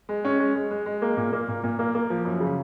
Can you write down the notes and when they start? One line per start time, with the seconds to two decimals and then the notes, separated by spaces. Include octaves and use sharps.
0.09 G#3
0.25 C#4
0.40 G#3
0.55 G#3
0.71 G#3
0.86 G#3
1.02 A#3
1.17 A#2
1.33 A#3
1.48 A#2
1.64 A#2
1.79 A#3
1.95 A#3
2.10 F3
2.25 F#2
2.40 C#3